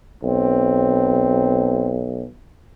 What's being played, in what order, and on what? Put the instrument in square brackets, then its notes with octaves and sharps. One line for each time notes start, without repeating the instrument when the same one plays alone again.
[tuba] B1 [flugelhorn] C4